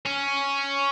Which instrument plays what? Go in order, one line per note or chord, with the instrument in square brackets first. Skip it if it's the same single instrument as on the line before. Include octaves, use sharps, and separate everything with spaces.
[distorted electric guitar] C#4